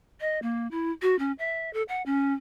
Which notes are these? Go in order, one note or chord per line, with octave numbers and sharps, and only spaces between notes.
D#5
A#3
E4
F#4
C#4
E5
A4
F#5
C#4